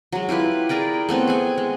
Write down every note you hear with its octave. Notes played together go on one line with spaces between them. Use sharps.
F#3 G#3
E4 F4 G4 B4
G#4 A#4 D5 G5
A3 B3 C4 C#5
G#4 F#5 G#5
G#3